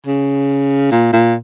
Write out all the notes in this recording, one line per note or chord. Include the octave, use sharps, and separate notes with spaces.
C#3
A#2
A#2